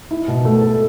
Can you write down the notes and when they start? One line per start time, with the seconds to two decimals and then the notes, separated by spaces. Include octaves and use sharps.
0.11 E4
0.28 B2
0.45 A3
0.61 A4